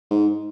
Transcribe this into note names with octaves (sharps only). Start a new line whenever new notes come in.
G#2